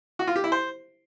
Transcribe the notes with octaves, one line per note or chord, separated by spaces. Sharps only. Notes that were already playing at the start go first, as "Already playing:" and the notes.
F#4
F4
G4
E4
C5